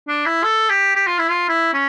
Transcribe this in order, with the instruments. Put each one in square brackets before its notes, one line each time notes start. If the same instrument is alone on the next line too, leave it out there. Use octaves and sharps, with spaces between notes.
[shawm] D4
E4
A4
G4
G4
F4
E4
F4
E4
C#4